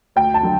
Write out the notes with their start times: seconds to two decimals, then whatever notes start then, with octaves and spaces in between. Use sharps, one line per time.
0.16 D2 G5
0.34 A5
0.43 D3 F#3